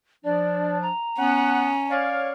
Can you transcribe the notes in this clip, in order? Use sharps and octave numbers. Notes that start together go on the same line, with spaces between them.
F3 D4 D5
A#5
B3 C#4 F#5
C#5 D5 F5